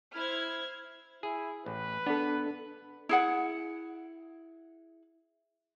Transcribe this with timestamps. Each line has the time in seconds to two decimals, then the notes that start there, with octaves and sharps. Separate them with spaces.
0.15 E4 C5 F6 G#6
1.23 E4 G#4
1.66 A1 B4
2.07 B3 D4 A4
3.09 E4 G#4 F#5